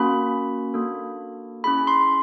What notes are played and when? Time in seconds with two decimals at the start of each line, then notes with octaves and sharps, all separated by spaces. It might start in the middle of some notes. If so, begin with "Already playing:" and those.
Already playing: A#3 C#4 F#4 B5
0.74 A#3 D4 F#4 A4
1.64 C#4 E4 G#4 B5
1.87 C6